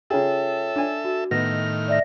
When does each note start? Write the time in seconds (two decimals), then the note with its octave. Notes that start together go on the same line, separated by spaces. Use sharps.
0.10 C#3 F4 G#4 A4 C#5 E5 G5
0.76 D4 G#5
1.05 F#4
1.31 A2 D#3 B3 D#5 F6 A#6
1.88 D5 E5 A#6